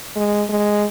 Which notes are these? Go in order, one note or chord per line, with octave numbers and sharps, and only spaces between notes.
G#3
G#3